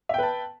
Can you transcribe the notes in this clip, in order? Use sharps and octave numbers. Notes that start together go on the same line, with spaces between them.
B4 E5 G5 A5